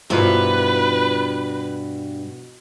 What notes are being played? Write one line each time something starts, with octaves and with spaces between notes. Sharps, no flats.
G2 B2 F3 E4 A#4 B4 F5